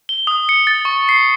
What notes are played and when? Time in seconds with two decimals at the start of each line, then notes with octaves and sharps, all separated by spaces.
0.09 G7
0.27 D#6
0.49 C#7
0.67 A6
0.85 C#6
1.09 C7